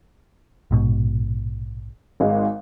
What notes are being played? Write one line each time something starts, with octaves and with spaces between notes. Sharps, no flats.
A#1 G#2 B2
G#1 G#3